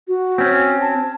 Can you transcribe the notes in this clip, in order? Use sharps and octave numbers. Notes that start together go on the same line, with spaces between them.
F#4
C4 C#4
A5